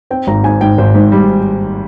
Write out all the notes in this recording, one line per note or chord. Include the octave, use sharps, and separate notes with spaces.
C4 G5
G#1 A#5
G#2 G#5
G#2 G5
G#1 C5
G#2
G3